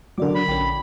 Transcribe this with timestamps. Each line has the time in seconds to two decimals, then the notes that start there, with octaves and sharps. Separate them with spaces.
0.18 D3 F#3 A#4 D5 D6
0.35 B5
0.48 A#1 C#4 G5